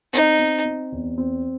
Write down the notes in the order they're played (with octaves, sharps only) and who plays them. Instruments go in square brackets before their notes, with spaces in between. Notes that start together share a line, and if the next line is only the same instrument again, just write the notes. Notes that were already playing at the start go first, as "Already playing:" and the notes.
[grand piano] C4 [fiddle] D#4
[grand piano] C4
C4
E2
C4